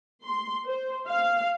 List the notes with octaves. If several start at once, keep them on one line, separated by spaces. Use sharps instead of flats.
C6
C5
F5